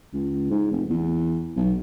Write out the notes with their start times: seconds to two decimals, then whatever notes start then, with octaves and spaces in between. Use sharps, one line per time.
0.13 C#2
0.50 G#2
0.71 F1
0.89 E2
1.56 B1